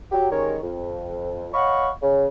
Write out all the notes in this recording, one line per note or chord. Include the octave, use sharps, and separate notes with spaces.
F#3 G4
D#3 G3 G#3 C#4 A#4 C#5
F2
C#5 D#5 F5 F#5 B5 C#6
C#3